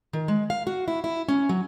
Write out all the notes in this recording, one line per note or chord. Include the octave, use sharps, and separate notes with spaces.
D#3
G#3
F5
F#4
E4
E4
C#4
F#3